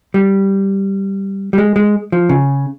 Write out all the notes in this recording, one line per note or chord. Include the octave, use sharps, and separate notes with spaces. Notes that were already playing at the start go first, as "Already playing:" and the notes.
G3
G3
G#3
G#3
F3
C#3